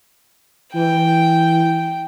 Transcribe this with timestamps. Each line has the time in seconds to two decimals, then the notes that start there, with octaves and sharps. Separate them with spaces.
0.74 E3 G5